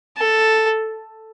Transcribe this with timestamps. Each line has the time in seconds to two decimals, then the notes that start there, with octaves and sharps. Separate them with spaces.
0.17 A4